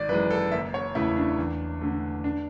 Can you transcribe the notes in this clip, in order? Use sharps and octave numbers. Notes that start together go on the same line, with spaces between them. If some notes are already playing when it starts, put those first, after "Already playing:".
Already playing: G#1 D5
F#2 E3 G#3 B4
A4
F#1 E5
C#5
E2 C#3 E3 A3 E4
D4
E2
D3 A3
D4